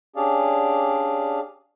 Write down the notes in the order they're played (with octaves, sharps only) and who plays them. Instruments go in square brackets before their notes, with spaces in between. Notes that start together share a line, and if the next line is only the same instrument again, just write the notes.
[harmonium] C#4 D4 G4 G#4 D5 F5